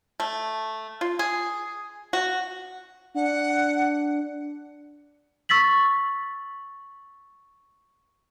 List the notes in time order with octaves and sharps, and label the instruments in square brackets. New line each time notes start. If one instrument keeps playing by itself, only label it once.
[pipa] A3
F4
G#4
F#4
[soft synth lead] D4 [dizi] F#5
[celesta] C#6 E6 A6 B6 F#7